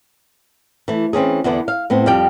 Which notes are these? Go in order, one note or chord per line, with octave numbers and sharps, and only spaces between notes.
E3 A3
E3 C4 C#4 G#4
E2 D3 B3 D4 B4
F5
A2 B3 C4
F2 G3 G4 G5